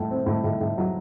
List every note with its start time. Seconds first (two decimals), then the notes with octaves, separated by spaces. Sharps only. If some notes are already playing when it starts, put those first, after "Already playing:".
Already playing: A2 A3
0.10 C4
0.26 A2
0.44 A2
0.61 A2
0.78 F#3